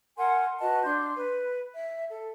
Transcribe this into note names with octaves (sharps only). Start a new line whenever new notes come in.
A#4 F#5 G#5 C6
F#4 B4 D#5 A5
D4 C6 G6
B4
E5
A4